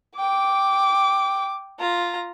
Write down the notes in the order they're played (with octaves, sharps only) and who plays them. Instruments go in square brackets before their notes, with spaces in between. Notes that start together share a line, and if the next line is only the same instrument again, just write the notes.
[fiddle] G5 [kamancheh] D6
[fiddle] F4 A#5